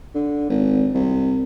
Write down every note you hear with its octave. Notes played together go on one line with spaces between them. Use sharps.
D3
G#1
C2